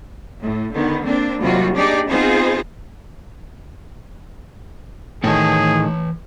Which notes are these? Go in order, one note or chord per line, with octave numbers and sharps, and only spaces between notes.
A2
D3 D#3 B3
A#3 C4 D4
D#2 C3 F#3 G3 F4 F#4
D4 D#4 G4 G#4 D5
B3 C4 D#4 F4 G#4 C5
A2 D#3 E3 G#4 C#5 A5